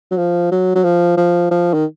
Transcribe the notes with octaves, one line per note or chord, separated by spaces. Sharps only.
F#3
F3
F#3
F#3
F3
F3
F3
D#3